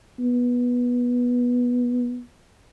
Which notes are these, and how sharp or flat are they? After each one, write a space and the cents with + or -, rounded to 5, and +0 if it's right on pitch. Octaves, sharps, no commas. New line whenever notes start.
B3 -15